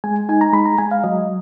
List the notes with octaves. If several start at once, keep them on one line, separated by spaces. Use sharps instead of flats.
G#3 G#5
D#4 G#5
A#5
G#3 B5
A#5
G#3 G#5
F5
F#3 D#5